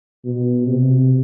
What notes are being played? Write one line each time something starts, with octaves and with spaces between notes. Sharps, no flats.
B2
C3